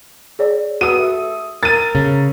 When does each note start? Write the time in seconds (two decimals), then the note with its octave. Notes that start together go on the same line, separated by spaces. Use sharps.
0.39 G#4 C#5 D5
0.81 B3 F#4 D#6 D#7
0.98 A3
1.63 A#4 A6 D#7
1.95 C#3